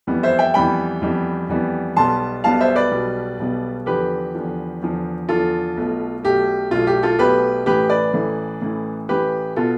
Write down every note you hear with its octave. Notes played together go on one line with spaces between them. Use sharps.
F2 E3 G3 B3
C5 E5
E5 G5
F2 E3 G3 B3 G5 B5
F2 E3 G3 B3
F2 E3 G3 B3
B1 B2 G3 B3 A5 C6
B1 B2 G3 B3 F5 A5
C5 E5
B4 D5
B1 B2 G3 B3
B1 B2 G3 B3
E2 D3 F3 G4 B4
E2 D3 F3
E2 D3 F3
E2 D3 F3 F4 A4
B1 B2 A3
B1 B2 A3 G4
B1 B2 A3 F4
G4
F4 A4
B1 B2 A3 G4 B4
A1 A2 E3 A3 G4 B4
B4 D5
A1 A2 E3 A3
A1 A2 E3 A3
A1 A2 E3 A3 G4 B4
B2 B3 F4 A4